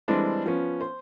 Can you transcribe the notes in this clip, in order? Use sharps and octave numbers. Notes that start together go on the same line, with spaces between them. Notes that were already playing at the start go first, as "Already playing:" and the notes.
E3 G3 G#3 C4 D4 A4
F3 B3 C#4
C5